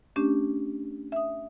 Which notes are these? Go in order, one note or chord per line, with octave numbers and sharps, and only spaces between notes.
A3 C#4 D4 G4
E5 D#6